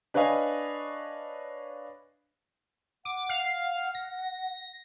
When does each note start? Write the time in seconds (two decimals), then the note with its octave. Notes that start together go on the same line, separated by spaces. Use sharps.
0.14 D4 B4 C#5 D#5 F5 G#5
3.05 F#5 D6
3.29 F5
3.95 A#6